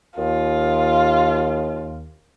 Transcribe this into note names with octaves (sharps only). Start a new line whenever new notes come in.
D#2 F4